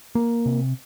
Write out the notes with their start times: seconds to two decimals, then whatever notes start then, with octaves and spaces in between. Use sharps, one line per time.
0.15 A#3
0.46 C3